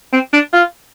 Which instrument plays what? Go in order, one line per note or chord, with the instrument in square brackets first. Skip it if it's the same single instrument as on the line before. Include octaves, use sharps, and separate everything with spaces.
[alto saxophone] C4
D4
F4